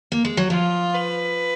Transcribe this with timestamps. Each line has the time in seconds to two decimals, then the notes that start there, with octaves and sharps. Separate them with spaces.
0.12 A#3
0.25 G#3
0.37 F#3
0.50 F3 F4
0.94 B4